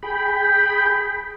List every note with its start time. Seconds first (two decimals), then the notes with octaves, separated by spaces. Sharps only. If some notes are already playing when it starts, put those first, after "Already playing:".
0.03 G#4 G5 B5